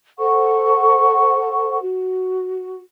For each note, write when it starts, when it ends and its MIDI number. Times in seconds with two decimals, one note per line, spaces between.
0.19 1.78 69
0.19 1.78 72
0.19 1.78 78
0.19 1.78 85
1.82 2.80 66